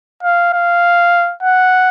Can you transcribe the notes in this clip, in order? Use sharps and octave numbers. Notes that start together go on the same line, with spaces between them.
F5
F5
F#5